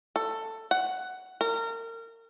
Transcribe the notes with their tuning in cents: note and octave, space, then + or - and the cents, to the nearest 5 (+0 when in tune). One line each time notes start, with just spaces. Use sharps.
A4 +15
F#5 +10
A#4 -30